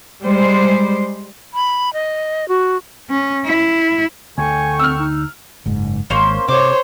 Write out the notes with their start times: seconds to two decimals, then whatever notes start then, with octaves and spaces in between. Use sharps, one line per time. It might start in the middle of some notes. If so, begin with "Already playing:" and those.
0.23 G3 G#3 C5
1.54 B5
1.93 D#5
2.49 F#4
3.10 C#4
3.45 E4
4.38 D2 D3 G5 G#5 C#6
4.79 C4 E6 F6
4.99 D#4
5.66 F#1 G#2
6.10 G#1 A#3 C#4 C5
6.49 C3 C5 C#5 D6